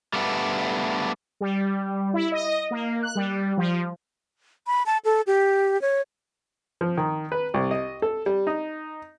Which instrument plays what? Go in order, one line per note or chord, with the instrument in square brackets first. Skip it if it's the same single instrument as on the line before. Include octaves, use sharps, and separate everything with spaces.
[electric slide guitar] G3 A3 B3 D4
[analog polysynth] G3
E4
D#5
A#3
F#6
G3
F3
[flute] B5
A5
A4
G4
C#5
[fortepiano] F3
D#3
B4
C2
D#5
A4
G3
D#4